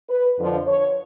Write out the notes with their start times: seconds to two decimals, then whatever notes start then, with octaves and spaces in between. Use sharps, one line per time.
0.09 B4
0.37 F2 D3 F3
0.67 C#5